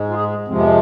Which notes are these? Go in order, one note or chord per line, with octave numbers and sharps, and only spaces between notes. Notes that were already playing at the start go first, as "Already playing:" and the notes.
Already playing: G#2 G#3
F4
G#4
F2 C3 F3 G#3 C4
B3